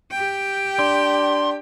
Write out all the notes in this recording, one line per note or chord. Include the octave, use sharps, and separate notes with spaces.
G4 G5
D4 C6